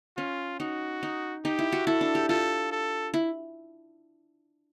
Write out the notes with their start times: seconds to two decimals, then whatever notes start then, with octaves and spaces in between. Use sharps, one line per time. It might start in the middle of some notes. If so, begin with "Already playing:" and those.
0.17 C#4 F4
0.60 D#4 F#4
1.03 D#4
1.45 D#4 G4
1.59 E4
1.72 F#4
1.87 E4 A4
2.01 D4
2.15 G4
2.29 F4 A4
2.72 A4
3.14 E4